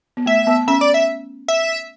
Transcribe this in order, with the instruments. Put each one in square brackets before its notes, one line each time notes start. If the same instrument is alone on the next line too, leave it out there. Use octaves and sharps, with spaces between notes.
[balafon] B3
[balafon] A3 [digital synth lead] E5
[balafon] B3
[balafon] C#4 [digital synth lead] E5
[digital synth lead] D5
E5
E5